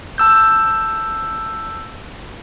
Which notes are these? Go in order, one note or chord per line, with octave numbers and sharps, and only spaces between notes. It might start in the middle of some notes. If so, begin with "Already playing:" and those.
A5 E6 G6